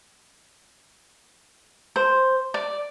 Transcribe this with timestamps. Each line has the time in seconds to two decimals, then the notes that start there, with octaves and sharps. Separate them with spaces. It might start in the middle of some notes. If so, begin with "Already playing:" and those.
1.96 C5
2.54 D5